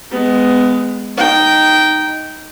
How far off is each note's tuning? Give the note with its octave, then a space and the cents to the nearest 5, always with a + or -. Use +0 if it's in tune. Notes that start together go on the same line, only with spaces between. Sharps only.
G#3 +0 B3 +25
D#4 +0 G5 -15